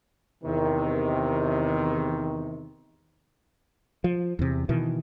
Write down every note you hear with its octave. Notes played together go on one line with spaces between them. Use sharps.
E2 C3 D#3
F3
E2 C3
B2 D#3 E3